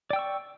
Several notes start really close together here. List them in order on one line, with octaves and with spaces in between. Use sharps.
D5 G5 E6 C#6